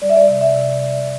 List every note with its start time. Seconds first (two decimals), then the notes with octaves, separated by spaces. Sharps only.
0.02 G3 D5
0.10 E5
0.16 D5
0.28 C3
0.41 E5
0.54 C3
0.80 C3